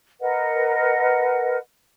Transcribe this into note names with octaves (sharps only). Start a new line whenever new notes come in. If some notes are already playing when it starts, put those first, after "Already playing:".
A#4 B4 D#5 F#5